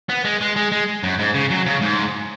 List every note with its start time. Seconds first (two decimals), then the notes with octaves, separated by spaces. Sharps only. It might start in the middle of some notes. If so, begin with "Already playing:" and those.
0.09 B3
0.24 G#3
0.41 G#3
0.56 G#3
0.72 G#3
1.03 F#2
1.19 G#2
1.34 C#3
1.50 F#3
1.66 C#3
1.82 G#2